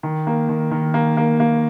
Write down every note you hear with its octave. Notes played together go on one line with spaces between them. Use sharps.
D#3
A#3
D#3
D#3
A#3
A#3
A#3